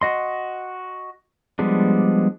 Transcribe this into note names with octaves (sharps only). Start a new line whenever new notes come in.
F#4 D#5 C6
F3 G3 G#3 B3 D4